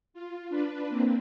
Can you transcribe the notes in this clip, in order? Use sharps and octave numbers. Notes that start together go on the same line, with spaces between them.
F4
D4 B4
A#3 C4